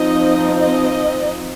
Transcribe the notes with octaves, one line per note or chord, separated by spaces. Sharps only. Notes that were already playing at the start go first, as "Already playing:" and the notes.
Already playing: F3 C4 D#4 D#5
D#5